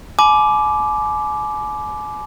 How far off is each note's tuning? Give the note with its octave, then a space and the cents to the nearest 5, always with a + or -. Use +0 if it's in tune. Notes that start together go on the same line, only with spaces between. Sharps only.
G#5 +40 B5 +0 D6 +0